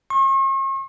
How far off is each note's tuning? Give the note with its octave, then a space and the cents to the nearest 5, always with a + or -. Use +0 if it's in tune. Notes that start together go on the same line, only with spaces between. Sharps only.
C#6 -45